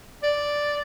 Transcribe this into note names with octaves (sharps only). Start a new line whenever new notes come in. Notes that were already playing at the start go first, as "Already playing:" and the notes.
D5